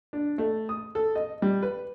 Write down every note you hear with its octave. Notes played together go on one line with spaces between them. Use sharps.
D4
A3
D#6
A4
D#5
G3
B4